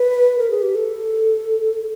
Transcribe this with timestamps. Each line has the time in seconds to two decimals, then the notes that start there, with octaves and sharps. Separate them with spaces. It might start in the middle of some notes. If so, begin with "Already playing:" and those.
Already playing: B4
0.39 A#4
0.51 G#4
0.62 G4
0.75 A4